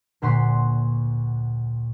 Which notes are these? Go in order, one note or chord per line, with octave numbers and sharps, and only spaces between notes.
D2 A#2 F#5 C6 C#6 B6